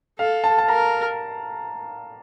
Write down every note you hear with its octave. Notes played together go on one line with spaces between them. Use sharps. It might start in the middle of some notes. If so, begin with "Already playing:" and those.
A4 F5
A5
A5
A#4 A#5